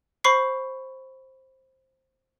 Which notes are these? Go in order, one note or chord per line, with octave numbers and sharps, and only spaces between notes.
C5 B5 C#6 C7